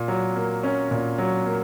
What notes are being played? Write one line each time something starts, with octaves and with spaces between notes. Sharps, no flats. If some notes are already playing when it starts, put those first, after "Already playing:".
Already playing: A#2
F#3
A#3
C#4
A#2
F#3
A#3